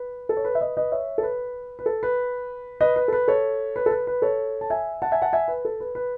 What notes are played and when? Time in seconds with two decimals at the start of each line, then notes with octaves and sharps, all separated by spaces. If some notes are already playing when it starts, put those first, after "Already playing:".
Already playing: B4
0.29 A4
0.37 C#5
0.45 B4
0.55 E5
0.61 B4 D#5
0.77 B4 D#5
0.92 C#5 E5
1.18 A4
1.23 B4
1.79 B4
1.86 A4
2.03 B4
2.81 B4 D#5
2.96 B4
3.08 A4
3.13 B4
3.28 A4 C#5
3.76 B4
3.86 A4
3.91 B4
4.07 B4
4.22 A4 C#5
4.61 A5
4.70 E5 G#5
5.02 F#5 A5
5.12 E5 G#5
5.22 F#5 A5
5.33 E5 G#5
5.48 B4
5.65 A4
5.80 B4
5.95 B4